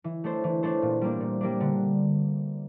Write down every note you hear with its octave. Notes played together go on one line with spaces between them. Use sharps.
E3
A3 D4 A4 C5
E3
A3 D4 A4 C5
A#2
G3 A#3 D4
A#2
G3 A#3 D4
D3